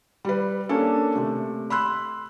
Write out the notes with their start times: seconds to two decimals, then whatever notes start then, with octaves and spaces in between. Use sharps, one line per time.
0.25 G3 B4
0.69 A#3 C#4 D4 A4
1.16 C3 A3
1.70 B5 C6 E6 F#6